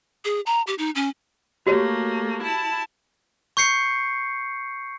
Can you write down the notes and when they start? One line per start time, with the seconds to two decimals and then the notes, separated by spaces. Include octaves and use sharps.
0.25 G#4
0.46 A#5
0.67 G4
0.78 D#4
0.95 C#4
1.67 A3 A#3 F#4 G4 C#5
2.43 E4 A5
3.57 C#6 G6 C7 C#7